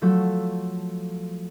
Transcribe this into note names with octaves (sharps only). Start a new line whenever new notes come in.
F3 F#3 A3 A4